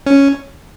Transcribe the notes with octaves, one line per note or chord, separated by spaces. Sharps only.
C#4